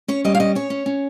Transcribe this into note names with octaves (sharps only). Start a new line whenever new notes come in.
C#4 C#5
G3 D#5
F5
C#4 D#5
C#4 C#5
C#4
C#4